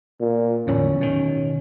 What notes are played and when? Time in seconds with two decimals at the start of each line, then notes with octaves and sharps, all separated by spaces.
0.20 A#2
0.67 D1 E2 A2 C#4
1.01 B2 D#3